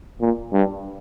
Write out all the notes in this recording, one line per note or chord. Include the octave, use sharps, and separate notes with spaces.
A#2
G2